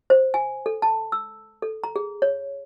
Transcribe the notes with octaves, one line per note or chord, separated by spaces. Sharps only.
C5
G#5
A4
A5
E6
A4
A#5
G#4
C#5